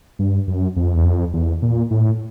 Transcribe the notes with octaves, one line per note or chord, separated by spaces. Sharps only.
G2
F#2
F2
E2
F2
E2
A#2
A2